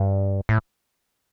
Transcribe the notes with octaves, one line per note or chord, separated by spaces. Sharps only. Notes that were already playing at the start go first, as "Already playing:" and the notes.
Already playing: G2
A2